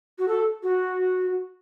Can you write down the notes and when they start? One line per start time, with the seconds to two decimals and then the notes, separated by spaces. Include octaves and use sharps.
0.19 F#4
0.28 A4
0.63 F#4